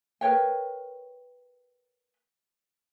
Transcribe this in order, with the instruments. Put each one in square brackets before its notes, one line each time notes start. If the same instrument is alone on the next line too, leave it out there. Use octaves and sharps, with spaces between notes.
[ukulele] A#4 B4 C#5 G5